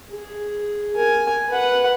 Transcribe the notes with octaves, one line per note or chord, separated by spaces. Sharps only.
G#4
A#4 G#5
B4 F#5